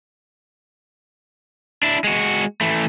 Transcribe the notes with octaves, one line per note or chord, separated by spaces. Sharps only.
D4 E4
G#3 F#4
E3 A3